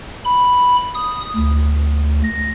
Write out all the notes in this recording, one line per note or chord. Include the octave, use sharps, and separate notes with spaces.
B5
D#6
D2
A#6